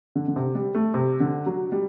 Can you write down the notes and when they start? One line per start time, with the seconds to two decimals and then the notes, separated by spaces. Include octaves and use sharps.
0.15 D3
0.28 D3
0.36 C3
0.55 G3
0.75 A3
0.94 C3
1.20 D3
1.46 F#3
1.72 G3